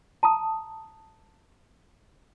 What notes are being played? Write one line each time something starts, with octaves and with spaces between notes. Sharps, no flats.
A5 A#5 D#6